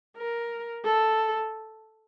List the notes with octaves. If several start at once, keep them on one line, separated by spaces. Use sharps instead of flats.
A#4
A4